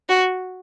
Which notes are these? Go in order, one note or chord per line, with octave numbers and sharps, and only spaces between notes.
F#4